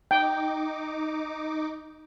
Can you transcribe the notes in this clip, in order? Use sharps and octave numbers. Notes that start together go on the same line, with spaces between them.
D#4 G5 D6